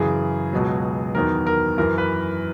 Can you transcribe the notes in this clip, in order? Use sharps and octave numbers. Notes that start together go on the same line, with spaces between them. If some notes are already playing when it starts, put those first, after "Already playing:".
Already playing: F#2 C#3 E3 G#4
C#2 B2 F#3
E2 D#3 F#3 A#4
A#4
F#2 E3 A#4
B4